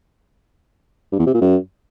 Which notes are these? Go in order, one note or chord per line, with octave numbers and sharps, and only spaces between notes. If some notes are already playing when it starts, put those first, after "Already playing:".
G2
E2
C3
A#2
F#2